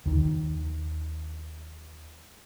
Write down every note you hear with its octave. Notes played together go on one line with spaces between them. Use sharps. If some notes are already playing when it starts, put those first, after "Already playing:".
D#2 D#3